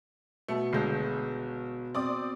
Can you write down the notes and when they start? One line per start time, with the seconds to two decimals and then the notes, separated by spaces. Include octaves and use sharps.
0.48 B2 A3
0.73 G1 G#3 G6 C7
1.95 C4 D5 D6 D#6